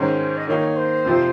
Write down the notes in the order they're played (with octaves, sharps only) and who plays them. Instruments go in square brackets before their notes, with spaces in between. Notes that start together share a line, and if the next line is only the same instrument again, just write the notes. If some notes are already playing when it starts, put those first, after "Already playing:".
Already playing: [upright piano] G#2 D#3 G#3 C#4 [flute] C5
[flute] D#5
[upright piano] D#3 A#3 D#4 [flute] C#5
[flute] C5
[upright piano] F2 C3 F3 C4